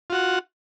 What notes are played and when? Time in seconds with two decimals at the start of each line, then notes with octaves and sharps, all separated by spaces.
0.10 F4
0.12 F#4
0.15 F#5